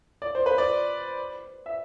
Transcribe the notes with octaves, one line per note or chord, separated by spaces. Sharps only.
D5
C5
B4
D5
E5